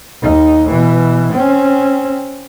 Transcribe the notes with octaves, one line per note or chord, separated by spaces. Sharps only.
D#2 D#4
B2 E3
C4 C#4